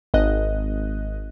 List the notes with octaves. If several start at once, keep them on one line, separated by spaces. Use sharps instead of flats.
G#1 D#5 F#6